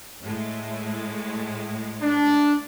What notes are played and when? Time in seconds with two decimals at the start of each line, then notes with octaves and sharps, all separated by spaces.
0.21 A2 G#3
2.00 D4